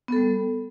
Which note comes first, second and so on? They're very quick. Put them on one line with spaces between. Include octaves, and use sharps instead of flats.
B3 A4 G3